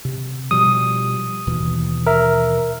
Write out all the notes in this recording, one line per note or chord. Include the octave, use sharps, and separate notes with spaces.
C3
B2 F3 G3 D#6
D#2 B2 E3
A#4 E5